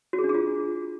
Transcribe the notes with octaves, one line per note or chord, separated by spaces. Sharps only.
F#4
G#4
D4
G#4
F4